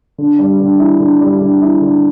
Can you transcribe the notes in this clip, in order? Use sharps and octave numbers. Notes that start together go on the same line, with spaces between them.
D3
G3
D3
E4
D3
G3
D3
E4
D3